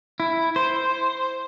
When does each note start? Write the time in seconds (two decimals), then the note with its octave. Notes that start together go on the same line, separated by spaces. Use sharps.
0.20 E4
0.56 C5